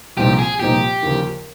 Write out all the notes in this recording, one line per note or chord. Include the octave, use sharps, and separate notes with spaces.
C2 A#2 F3 C4 D#4 G4
G#4
C2 A#2 F3 C4 D#4 G4
D#2 C#3 F3